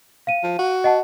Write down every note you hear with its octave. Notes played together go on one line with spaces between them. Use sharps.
F5 D#7
F3
F#4
D#5 F#5 A5